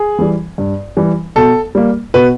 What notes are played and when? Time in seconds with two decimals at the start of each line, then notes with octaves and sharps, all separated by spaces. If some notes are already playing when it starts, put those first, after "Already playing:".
Already playing: G#4
0.19 E3 G3
0.58 G2
0.97 E3 G3
1.36 B2 A4
1.75 G3 A#3
2.14 B2 B4